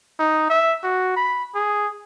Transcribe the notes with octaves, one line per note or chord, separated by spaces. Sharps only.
D#4
E5
F#4
B5
G#4